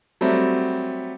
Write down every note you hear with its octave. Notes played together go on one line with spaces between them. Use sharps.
F#3 G3 A3 C4